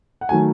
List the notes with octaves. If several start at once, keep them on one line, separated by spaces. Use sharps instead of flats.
F#5
D#3 F#3 A3 G#5